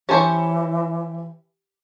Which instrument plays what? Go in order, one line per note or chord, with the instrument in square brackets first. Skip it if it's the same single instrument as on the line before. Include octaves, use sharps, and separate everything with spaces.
[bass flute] E3 [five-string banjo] C#4 C5 C#5 [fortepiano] G4 A5